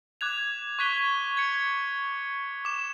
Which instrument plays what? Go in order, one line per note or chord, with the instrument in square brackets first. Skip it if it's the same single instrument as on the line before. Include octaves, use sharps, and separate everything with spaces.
[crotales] D6 F#6 G#6 F7
C#6 F#6 G#6 B6 D#7 G7
G#6 C#7
D6 E7